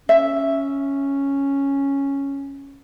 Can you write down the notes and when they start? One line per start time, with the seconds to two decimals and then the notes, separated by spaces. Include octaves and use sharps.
0.09 C#4 E5